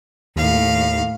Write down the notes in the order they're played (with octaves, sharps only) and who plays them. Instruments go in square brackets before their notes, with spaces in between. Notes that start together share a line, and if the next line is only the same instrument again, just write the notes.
[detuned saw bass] D#2 [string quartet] A2 F5